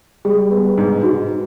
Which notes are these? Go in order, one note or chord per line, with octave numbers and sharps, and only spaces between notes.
G3 G#4
B3
G#2
G#2 F#4